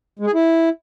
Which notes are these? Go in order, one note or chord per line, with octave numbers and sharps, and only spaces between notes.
G#3
G#4
E4